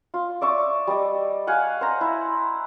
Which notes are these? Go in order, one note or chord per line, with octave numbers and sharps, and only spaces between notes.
F4
D5 E5 C#6 D6
G3 D#5
F5 F#5 G#5
C5 A#5
E4